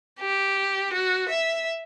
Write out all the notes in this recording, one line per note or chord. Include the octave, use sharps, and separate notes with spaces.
G4
F#4
E5